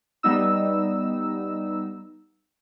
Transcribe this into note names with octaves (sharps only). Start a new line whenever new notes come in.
G3 B3 D#4 E6